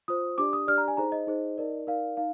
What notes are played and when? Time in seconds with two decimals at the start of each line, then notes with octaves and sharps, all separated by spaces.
0.08 F4 C5 D#6
0.38 D4 G4 D5 D6
0.53 D#6
0.68 D4 G4 D5 F6
0.78 A#5
0.88 G#5
0.97 D#4 G#4 C5 A#5
1.12 D#5
1.27 D#4 G#4 C5
1.58 D#4 A#4 D5
1.87 D#4 A#4 D5 F5
2.17 D#4 F5